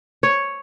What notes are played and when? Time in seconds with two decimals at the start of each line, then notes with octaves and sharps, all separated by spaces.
0.23 C#5